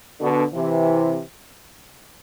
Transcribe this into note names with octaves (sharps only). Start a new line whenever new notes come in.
B2 D3
C3 E3